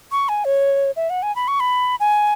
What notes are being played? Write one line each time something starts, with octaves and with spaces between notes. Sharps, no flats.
C#6
G#5
C#5
E5
F#5
G#5
B5
C#6
B5
G#5